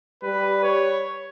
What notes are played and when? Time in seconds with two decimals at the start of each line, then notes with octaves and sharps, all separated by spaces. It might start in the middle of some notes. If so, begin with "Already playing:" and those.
0.23 G3 B4
0.63 C#5